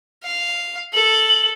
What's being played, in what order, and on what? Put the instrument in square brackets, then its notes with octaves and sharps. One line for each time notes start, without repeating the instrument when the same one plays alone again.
[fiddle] F5
[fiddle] A4 [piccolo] F#7